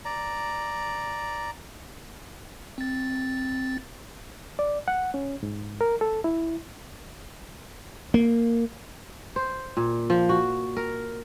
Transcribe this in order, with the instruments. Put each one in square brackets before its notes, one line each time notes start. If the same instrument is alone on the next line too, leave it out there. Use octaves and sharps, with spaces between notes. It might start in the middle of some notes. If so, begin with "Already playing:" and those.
[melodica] D5 A#5
[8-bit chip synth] C4 A6
[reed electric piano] D5
F#5
C#4
G#2
A#4
A4
E4
[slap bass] A#3
[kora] C5
A#2
F3
F#4
A#4